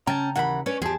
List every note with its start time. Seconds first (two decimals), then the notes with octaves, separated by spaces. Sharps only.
0.07 C#3 C#4 G5 A5 A#5
0.36 D#2 E3 F#5 G5 B5
0.66 C#4 B4 C#5 D5
0.82 E2 F3 G4 G#4 A5